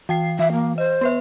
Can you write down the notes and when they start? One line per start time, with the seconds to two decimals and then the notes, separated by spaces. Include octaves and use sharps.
0.09 E3 G5 C7
0.39 E3 E5
0.53 A#3
0.78 C5 D#5
1.01 B3 B4 E5